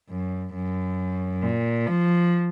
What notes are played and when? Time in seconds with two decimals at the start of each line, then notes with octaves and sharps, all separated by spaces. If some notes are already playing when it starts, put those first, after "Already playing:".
0.10 F#2
0.54 F#2
1.43 A#2
1.87 F3